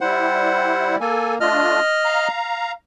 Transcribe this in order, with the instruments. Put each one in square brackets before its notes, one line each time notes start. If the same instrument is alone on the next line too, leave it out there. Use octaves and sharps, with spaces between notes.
[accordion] G3 E4 [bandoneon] C5 F#5
[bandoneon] A#3 [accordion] A4 G#5
[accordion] A3 D4 F4 [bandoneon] D#5 F6
[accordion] F5 A#5